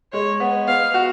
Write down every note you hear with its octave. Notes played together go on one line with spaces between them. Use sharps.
G#3 C#5
B3
B3 F5
F#4